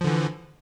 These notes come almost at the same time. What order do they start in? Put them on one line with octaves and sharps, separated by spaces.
F3 D3 E3